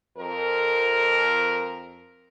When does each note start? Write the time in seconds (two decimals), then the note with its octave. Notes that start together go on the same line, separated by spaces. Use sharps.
0.17 F2 A#4